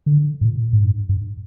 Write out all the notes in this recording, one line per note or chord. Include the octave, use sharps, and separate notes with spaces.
D3
G#2
A#2
G#2
G2
G2